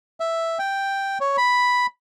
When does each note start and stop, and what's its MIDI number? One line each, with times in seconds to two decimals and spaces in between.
0.20 0.58 76
0.59 1.18 79
1.21 1.37 73
1.37 1.86 83